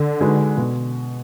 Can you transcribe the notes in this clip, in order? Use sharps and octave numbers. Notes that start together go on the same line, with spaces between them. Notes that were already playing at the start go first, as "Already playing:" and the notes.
Already playing: D3
G#3 D#4 F#4 B4
B2